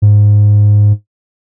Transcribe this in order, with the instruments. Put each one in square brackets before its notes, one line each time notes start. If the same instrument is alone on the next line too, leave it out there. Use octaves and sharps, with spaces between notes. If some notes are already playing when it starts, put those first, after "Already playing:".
[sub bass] G#2